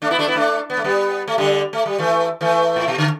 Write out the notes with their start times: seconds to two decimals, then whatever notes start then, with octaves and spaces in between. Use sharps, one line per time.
0.02 A3 D4
0.10 B3 E4
0.19 A3 D4
0.27 B3 E4
0.35 A3 D4
0.70 B3
0.77 A3
0.84 G3 B3
1.28 A3
1.38 D3 G3
1.73 A3
1.86 G3
1.98 E3 A3
2.41 E3 A3
2.76 A2
2.88 B2
2.98 D3